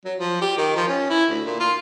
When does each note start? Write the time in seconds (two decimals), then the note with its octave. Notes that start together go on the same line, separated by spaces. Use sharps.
0.05 F#3
0.19 F3
0.41 G4
0.58 D#3
0.76 F3
0.87 C#4
1.10 E4
1.29 D2
1.45 A#2
1.60 F4